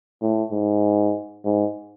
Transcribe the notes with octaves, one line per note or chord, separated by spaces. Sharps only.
A2
G#2
G#2